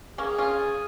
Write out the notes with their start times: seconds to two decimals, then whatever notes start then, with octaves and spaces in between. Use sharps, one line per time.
0.18 A#3 C#4 G#4
0.38 C#4 F4